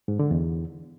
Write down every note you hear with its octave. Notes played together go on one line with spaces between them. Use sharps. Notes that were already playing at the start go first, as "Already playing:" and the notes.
G#2
D3
E2